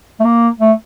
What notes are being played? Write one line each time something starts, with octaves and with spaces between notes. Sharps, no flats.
A3
A#3
A3